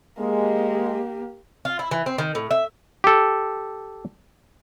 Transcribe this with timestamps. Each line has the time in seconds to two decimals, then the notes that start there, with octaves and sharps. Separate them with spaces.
0.19 G#3 A#3 G4
1.65 F4
1.79 E4
1.91 E3
2.06 C4
2.18 D#3
2.35 A2
2.51 E5
3.04 G4 A4